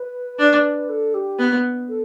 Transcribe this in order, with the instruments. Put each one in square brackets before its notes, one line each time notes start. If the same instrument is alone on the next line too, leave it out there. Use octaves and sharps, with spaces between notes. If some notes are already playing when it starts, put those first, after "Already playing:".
Already playing: [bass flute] B4
[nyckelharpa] D4
[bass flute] A4
G4
[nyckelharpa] B3
[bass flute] A4